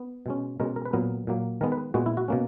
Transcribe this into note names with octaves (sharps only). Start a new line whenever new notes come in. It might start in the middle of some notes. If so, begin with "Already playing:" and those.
Already playing: B3
B2 G#3 C#4
B2 G#3 C#4 A#4
A#4
B4
A#2 F#3 B3 A#4
A#2 F#3 A#3
D#3 G#3 B3 A#4
B4
A#2 G#3 B3 F#4
E4
F#4
B2 A#3 C#4